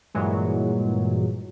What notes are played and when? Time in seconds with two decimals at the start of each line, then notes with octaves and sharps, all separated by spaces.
0.14 G2 A#2 E3 F#3 G#3